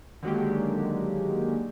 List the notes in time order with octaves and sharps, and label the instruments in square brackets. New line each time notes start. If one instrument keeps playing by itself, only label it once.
[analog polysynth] D3 D#3 F#3 G#3 A#3 G4